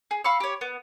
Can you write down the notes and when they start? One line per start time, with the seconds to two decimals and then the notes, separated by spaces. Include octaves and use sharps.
0.11 G#4
0.24 F5 B5 C#6 E6
0.40 G4 C#5
0.61 B3